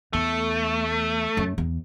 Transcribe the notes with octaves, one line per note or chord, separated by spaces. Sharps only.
E2 A3
F#2
E2